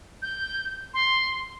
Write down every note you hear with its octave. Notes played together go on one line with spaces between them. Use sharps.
G6
C6